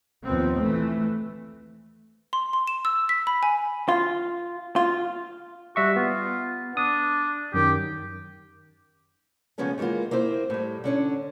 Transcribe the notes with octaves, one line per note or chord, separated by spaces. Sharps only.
D#2 F3 B3 C4
E3 A3
C6
C6
E7
E6
B6
B5
G#5
F4
F4
G3 F#4 E5 C#6
B3 F4
D4 D#6
F#2 D#3 G4
C#3 F3 G#3 B3 C#4 A4
D#3 E3 G#3 A#3 F4
A#3 C4 E4 C5
A2 G3
D3 C#4 D4